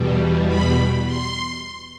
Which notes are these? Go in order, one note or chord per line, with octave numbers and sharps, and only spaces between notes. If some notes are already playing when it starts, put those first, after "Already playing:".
Already playing: E2 B2 G3
B5
C6